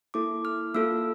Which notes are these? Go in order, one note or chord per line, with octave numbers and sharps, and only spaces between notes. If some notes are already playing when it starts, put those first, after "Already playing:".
A#3 E4 A4 D6
F6
A#3 F4 A4 E6